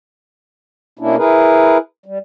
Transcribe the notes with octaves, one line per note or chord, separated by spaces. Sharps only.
B2 A#3 C#4 D4 E4
E4 G#4 A#4 B4
G3